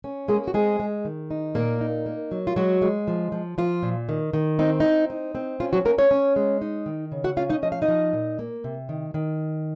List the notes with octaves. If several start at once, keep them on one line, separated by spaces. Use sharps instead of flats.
C#4
G#3 A#3 G#4
F#4
G#3 C4 G#4
G#3
D#3
D#4
A#2 A#3 A#4
D#4
A#3
F#3
F4
F#3 G#3 F#4
G#3
F3
F3
F3 F4
A#2
D#3
D#3
C4 D#4
C4 D#4
D#4
C4
C#4 F4
F#3 F#4
A#3 C#4 A#4
C#4 C#5
C#4
G#3
D#4
D#3
C#3
F#4 F#5
C#4 F4 F5
D#4 D#5
F3 D#5
F5
D#4 D#5
F3
A#2
A#3
C3
D#3
D#3